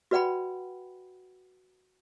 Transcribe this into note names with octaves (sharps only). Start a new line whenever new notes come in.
F#4 B4 D5 F#5 G5 B5